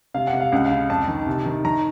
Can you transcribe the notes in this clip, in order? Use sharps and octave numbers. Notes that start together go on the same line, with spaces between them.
C3 F5
F#5
C3
F5
C#2 F#5
C#3 F5
F2 A5
D#3
C3
D#3
D#3 A#5